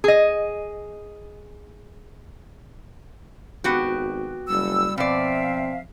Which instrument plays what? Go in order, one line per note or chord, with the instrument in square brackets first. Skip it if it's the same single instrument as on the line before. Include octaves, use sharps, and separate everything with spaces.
[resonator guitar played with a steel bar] G#4 D#5
[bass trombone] G#1 [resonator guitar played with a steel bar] B3 F#4 G4
[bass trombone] F#1 [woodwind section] G3 E6
[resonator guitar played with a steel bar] B2 D5 [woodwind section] F3 E5 F5 [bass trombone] C4